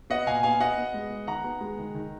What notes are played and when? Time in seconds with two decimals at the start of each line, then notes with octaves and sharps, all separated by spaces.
0.10 B3 D#5 F#5
0.27 A#2 F5 G#5
0.43 B3 F5 G#5
0.60 B3 D#5 F#5
0.78 B3
0.94 G#3
1.10 B3
1.27 D#3 F#5 A#5
1.44 B3
1.61 G#3
1.78 D#3
1.95 D#3